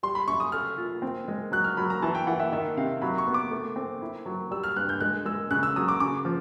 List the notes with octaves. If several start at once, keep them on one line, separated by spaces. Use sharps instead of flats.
G3 C6
B5
F#2 C#6
D#6
A4 F6
F4
C4
G#3
F#3 F#6
F6
F#3 B5
A#5
E3 A5
G5
E3 F#5
E5
D#3 E5
C3 F5
F#3 B5
C#6
B3
D6
A3
C4
E4
F#3
G3 E6
F6
G2 F#6
G6
G#3 F#6
G#3 E6
C#3 F#6
E6
F#3 D#6
D6
C#3 D6
F3